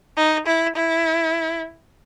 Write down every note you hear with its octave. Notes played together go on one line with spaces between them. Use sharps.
D#4
E4
E4